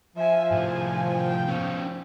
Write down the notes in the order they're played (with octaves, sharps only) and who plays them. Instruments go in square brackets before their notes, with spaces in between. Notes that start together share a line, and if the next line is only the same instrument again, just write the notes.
[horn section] F3 [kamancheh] E5 G#5
[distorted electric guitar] A2 C3 [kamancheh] G#5
[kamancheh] G5
[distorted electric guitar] B3 C#4